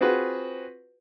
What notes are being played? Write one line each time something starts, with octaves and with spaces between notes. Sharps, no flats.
C4 F4 F#4 G#4 B4